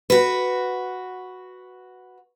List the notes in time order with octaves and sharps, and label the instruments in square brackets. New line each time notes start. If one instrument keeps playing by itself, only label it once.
[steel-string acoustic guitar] F#4 B4